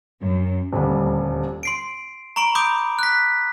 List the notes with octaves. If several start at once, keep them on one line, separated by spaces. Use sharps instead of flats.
F#2
D#1 D2 G3
C6 C7 D7
A#5 B5 C#6 D7 F#7
B5 C6 D6 D#6 G6 D7
F#6 B6